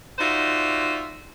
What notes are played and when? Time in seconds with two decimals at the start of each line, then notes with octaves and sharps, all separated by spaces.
0.19 D#4 F4 F#4 C5 D5 E5